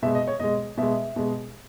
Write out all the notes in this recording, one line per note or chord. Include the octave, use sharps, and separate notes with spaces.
B2 G#3 E5
D#5
C#5
B2 G#3 D#5
B2 G#3 E5
B2 G#3